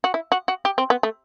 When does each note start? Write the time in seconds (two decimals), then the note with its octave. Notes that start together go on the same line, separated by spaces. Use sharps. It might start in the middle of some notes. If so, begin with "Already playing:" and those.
0.04 F#4
0.14 E4
0.32 F#4
0.48 F#4
0.65 G4
0.78 C4
0.90 B3
1.03 A3